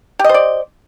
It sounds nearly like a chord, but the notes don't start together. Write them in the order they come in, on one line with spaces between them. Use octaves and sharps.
G4 D#5 C5 D5